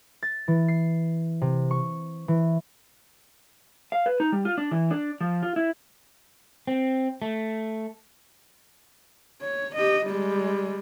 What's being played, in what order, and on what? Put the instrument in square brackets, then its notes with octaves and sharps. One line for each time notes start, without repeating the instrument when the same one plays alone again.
[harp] A6
E3
C7
C3
C#6
E3
[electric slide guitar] F5
B4
D#4
G3
F4
D4
E3
D4
F3
F4
E4
C4
A3
[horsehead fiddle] C#5
G4 D#5
G3 G#3